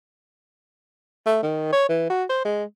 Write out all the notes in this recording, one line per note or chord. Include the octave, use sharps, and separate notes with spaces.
A3
D#3
C#5
E3
F#4
C5
G#3